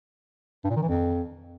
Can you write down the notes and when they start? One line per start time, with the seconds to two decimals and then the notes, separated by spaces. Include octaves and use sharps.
0.64 G2
0.70 A#2
0.76 D#3
0.82 E3
0.89 F2